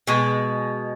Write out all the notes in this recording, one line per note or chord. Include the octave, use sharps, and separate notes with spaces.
B2 G#3